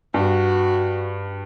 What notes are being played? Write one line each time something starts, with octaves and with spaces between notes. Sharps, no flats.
G2 F#4